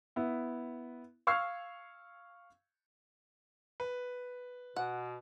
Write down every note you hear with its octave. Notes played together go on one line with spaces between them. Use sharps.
B3 E4
F5 C#6 E6 F6 G#6 C7
B4
B2 F#5